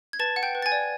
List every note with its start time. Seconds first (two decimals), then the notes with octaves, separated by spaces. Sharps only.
0.13 G#6
0.19 B4 A5 A6
0.36 F#5
0.43 G5 G6
0.55 B4
0.62 A6
0.66 G#5 G#6
0.72 D5